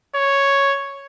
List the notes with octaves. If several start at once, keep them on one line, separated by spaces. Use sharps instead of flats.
C#5